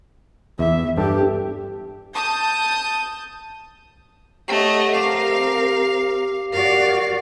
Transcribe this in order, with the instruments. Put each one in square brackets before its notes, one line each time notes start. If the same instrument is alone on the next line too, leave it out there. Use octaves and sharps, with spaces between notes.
[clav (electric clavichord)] E2 [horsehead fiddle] E5
[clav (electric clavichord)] G2 A4 [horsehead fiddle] G4
[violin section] A5 D#6 G6
[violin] A3 D#5 [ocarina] G4 [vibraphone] C#5 F#5 C#6
[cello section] C4 A#4 [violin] F5 [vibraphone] D6
[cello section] F#4 D5 [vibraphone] A#4 [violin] F5